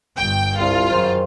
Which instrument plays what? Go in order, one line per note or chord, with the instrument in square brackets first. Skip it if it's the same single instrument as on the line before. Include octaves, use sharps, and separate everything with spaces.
[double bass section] G1 G2 [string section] G5
[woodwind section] C2 [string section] F4
[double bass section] F#2 [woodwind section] D#3 G#4 C5